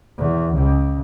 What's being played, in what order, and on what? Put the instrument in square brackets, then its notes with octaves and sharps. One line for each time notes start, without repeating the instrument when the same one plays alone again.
[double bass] E2
C#2